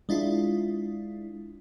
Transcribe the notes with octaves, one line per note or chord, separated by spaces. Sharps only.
G#3 D4 E4 F4